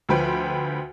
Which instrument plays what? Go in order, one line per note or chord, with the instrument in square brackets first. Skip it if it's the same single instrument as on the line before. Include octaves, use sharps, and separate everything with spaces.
[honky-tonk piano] D2 F3 B4 G5 C6